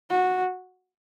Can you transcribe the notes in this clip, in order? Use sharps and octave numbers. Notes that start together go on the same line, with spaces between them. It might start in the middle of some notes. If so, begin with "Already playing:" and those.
F#4